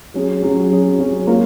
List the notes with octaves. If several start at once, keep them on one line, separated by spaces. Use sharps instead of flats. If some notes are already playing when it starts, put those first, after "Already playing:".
F#3 C#4 G#4
F#3 C#4 G#4
F#3 C#4 G#4
F#3 C#4 G#4
A#3 F4 A#4 C#5